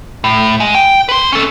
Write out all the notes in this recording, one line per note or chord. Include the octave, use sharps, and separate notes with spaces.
A2
G#3
G5
B4 C6
C#4 A4